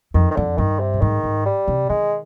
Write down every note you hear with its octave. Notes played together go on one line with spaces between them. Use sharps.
F2 D#3
D#3
F2 D3
G2 D#3
C3
A#2
G#2 D#3
G#2
G3
C3
D#3 G#3